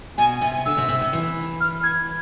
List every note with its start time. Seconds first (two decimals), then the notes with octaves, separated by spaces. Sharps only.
0.18 B2 G#5
0.41 C3 G#5
0.66 D3 E6
0.77 C3
0.89 C3
1.01 C3
1.13 E3
1.60 F6
1.83 G#6